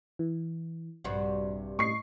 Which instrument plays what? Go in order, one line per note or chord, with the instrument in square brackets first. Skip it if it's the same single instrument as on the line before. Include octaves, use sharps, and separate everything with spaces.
[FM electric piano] E3
[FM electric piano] A#1 [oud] G2 C3 F#4
[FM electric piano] A2 D#5 [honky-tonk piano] C#6 C7